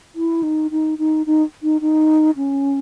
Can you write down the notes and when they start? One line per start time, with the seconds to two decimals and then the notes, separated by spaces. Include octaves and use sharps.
0.15 E4
0.43 D#4
0.71 D#4
0.99 D#4
1.27 D#4
1.63 D#4
1.81 D#4
2.37 C#4